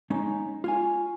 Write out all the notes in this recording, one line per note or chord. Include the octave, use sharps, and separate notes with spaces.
G#3 C#4 D#4
F4 C#5 G#5